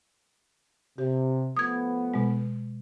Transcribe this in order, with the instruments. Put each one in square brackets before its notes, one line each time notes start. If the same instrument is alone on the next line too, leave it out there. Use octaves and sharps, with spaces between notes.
[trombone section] C3 [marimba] G4
[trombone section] F3 A3 B3 [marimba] D#6 G#6
[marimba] B2 G#3